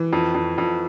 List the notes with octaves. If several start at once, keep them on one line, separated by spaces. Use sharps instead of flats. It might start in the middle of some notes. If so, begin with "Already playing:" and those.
Already playing: E3
F2
F2
F2